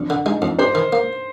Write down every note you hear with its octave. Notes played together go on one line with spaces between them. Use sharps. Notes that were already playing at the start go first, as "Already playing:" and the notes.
Already playing: F2 D4
D3
G#3 D#4
F2
D4 C5
D#3
A#3